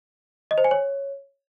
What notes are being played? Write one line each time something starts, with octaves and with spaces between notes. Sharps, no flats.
D#5
C5
G#5
C#5